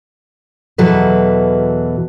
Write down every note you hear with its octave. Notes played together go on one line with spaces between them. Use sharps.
E2 B2 E3 F#3 A4 B4